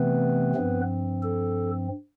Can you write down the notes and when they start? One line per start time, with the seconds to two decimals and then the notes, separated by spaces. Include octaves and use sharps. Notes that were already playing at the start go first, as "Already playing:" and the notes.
Already playing: C3 E3 A3 B3 C4 B4
0.54 G2 F3 C4
1.22 A4